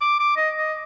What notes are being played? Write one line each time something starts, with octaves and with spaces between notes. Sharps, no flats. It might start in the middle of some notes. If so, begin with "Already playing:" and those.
D6
D6
D#5
D#5